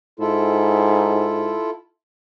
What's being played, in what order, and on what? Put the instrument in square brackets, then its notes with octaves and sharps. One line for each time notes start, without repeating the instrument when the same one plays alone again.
[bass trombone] G#2 [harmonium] E4 F4 A4